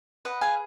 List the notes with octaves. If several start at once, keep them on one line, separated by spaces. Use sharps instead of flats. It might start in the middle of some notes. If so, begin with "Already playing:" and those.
B4 D#5 F#5
G#4 F5 G#5